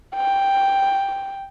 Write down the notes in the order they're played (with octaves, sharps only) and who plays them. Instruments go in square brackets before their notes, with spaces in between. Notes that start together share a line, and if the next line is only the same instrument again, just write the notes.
[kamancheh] G5